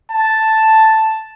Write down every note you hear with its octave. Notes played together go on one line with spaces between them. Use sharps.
A5